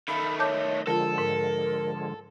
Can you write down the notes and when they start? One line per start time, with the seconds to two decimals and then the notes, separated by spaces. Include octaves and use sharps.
0.08 D#3 A3 A4 E5 F5 B5
0.39 C#5 D#5 A5 D6 G6
0.87 D3 F3 G#3 F4 A4 A#4 A5
1.18 G#2 A#4